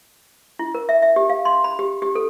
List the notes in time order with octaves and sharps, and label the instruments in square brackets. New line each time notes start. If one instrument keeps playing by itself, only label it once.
[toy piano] E4
A#4
E5
E5
G4
F5
C6
B5
G4
G4
A4